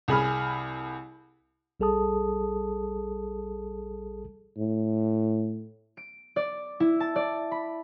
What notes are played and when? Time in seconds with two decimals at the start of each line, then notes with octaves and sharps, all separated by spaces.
0.08 C2 G#4 B5 F6
1.80 A#1 G3 G#4 A4 A5 D#6
4.57 A2
5.97 D7
6.36 D5
6.80 E4
7.00 A5
7.16 D5
7.51 B5